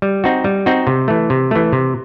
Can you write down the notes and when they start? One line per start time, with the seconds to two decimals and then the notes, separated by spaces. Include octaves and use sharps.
0.02 G3
0.24 C4 D#4 F#4
0.44 G3
0.66 C4 D#4 F#4
0.87 C3
1.08 E3 A3
1.30 C3
1.51 E3 A3
1.72 C3